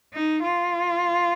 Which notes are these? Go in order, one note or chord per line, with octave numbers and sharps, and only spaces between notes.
D#4
F4